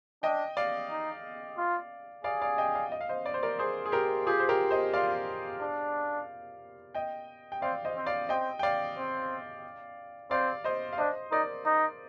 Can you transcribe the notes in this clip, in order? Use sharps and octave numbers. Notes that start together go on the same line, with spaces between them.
D4 D#5 G5
D5 F5
D#4
F4
G#4 D5 F5
D5 F5
D#5 G5
D5 F5
D#5
F5
C5 D#5
D5
C5
A#4 D5
G#4 C5
G#4
G4 A#4
F4 G4 G#4
C5
G4 A#4
C5 D#5
F4 D5 F5
D4
D#5 G5
G5
C4 D5 F5
C5 D#5
C4
D5 F5
C4 D#5 G5
G5
D5 F5
C4
C4 D5 F5
C5 D#5
F5
D4 C5 D#5
D#4 A#4 D5
D#4